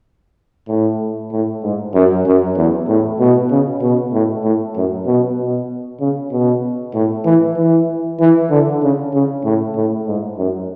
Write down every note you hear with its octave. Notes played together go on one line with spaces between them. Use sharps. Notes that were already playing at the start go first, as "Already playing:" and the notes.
A2
A2
G#2
F#2
F#2
E2
A2
B2
C#3
B2
A2
A2
F#2
B2
B2
C#3
B2
A2
E3
E3
E3
D3
C#3
C#3
A2
A2
G#2
F#2